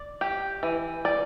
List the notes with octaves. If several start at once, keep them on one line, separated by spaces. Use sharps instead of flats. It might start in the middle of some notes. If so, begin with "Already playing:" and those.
Already playing: D5
G4
E3
D5